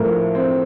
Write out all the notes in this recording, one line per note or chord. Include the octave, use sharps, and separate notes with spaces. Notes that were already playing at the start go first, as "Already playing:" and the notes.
Already playing: A2 F3 A#4
C4